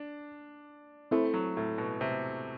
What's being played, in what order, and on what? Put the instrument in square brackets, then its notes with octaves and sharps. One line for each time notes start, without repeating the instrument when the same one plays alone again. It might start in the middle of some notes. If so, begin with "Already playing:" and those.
Already playing: [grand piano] D4
[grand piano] A3 [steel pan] C4 E4 A4
[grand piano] F#3
A2
B2
C3